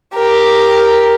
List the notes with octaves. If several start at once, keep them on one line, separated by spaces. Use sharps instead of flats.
G4 A#4